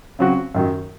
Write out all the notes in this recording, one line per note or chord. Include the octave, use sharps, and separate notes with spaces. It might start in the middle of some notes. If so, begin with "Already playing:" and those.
C#3 F#3 C4 F#4
F#2 D#3 F#3